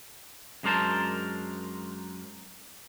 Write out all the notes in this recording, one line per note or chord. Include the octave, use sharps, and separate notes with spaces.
F#2 G#3 D4 A#4 C5 A5